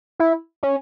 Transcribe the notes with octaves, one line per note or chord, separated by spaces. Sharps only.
E4
C#4